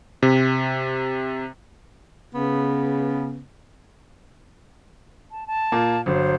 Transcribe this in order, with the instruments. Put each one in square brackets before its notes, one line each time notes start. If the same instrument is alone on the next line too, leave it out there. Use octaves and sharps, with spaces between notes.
[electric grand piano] C3
[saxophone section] C#3 B3
[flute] A5
A5
[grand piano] A#2 A#3
[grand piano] G1 F#3 [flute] C5